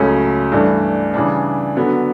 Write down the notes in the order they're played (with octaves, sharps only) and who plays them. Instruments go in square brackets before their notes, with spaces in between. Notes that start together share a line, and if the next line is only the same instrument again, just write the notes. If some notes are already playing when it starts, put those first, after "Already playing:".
Already playing: [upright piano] C#2 C#3 F#3 A3 C#4
G2 E3 A3 D4
C#3 E3 G3 D4
D3 F#3 B3